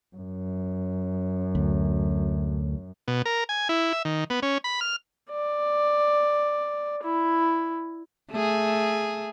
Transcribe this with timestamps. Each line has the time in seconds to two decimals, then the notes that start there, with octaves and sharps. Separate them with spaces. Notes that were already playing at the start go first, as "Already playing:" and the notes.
0.16 F#2
1.55 D2
3.08 B2
3.26 A#4
3.49 G#5
3.69 E4
3.93 E5
4.05 D#3
4.30 B3
4.42 C#4
4.64 B5
4.81 F6
5.30 D5
7.03 E4
8.31 A3 G#4